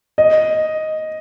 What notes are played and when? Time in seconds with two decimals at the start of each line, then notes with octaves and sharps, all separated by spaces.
0.18 D#5